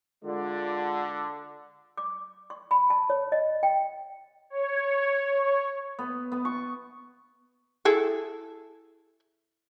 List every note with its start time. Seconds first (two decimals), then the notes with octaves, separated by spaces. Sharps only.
0.24 D3 G#3 F4 D5
1.98 D6
2.50 C#6
2.71 B5
2.90 A5
3.10 C#5
3.32 D#5
3.63 G5
4.50 C#5
5.99 B3
6.32 B3
6.45 C#6
7.85 E4 G#4 A4